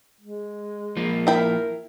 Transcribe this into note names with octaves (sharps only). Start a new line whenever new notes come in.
G#3
F3 A#3
E4 A#4 G5 B5